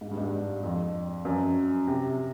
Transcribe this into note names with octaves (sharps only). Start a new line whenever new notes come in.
G#2
G2
G#2
G2
F2
F#2
C3